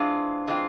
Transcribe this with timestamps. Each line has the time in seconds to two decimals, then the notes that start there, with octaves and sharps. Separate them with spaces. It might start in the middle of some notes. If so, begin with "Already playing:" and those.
Already playing: E3 G#3 C4 D4 F4
0.47 E3 G#3 C4 F4